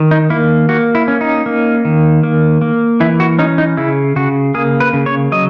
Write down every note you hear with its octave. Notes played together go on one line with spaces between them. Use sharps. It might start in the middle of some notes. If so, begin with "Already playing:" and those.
Already playing: D#3
D#4
A#3 E4
A#3 F#4
E4
C#4
D#4
A#3
D#3
A#3
A#3
E3 E4
F#4
C#4 D#4
D#4
C#3 E4
C#3 F#4
A#3 G#4
B4
C#3
C#5
F#3 D#5